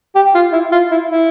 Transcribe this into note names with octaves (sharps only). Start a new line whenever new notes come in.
G4
F4
E4
F4
E4
E4